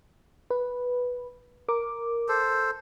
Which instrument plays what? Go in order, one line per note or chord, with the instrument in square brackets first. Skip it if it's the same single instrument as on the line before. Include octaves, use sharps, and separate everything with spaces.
[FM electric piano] B4
A#4 D6
[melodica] A4 C5